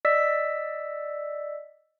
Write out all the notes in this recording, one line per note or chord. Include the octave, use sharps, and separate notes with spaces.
D5 D#5 E6 B6